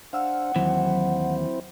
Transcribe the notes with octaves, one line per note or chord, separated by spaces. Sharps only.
D4 C5 F5 F#5 E6 F6
D#2 E3 F#3 C4 E4 C5